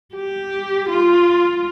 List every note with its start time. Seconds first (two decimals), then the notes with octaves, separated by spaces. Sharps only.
0.15 G4
0.89 F4